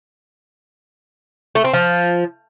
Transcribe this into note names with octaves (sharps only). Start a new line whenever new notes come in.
A3
C4
F3